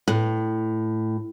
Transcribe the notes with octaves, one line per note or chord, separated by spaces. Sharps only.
A2